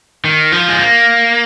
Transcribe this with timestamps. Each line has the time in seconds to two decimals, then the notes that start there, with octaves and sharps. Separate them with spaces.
0.25 D#3
0.52 F3
0.68 G#3
0.79 A#3